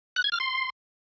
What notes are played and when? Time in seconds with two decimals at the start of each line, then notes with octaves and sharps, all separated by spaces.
0.16 F#6
0.24 G#6
0.32 F6
0.40 C6